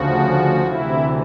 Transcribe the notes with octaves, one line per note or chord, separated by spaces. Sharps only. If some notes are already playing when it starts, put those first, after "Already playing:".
Already playing: D2 C#3 F3 F#4
D2 C3 E3 E4